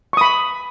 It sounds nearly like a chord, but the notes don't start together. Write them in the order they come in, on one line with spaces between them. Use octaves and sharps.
C#6 D#6 B5